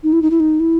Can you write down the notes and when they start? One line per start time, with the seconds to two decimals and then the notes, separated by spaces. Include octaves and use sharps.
0.03 D#4
0.13 E4
0.22 D#4
0.31 E4
0.40 D#4
0.60 E4